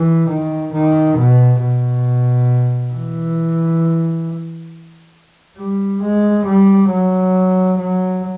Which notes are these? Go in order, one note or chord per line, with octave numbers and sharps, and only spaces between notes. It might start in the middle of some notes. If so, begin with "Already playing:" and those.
Already playing: E3
D#3
D#3
B2
B2
E3
G3
G#3
G3
F#3
F#3